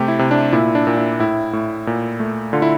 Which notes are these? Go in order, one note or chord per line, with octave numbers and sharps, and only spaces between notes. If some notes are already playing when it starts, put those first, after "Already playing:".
Already playing: C3 A3 G4
E4
C3
D4
A#2 E4
D4
A#2
E4
A2 E4
A2
A#2
A3
D3 F4
E4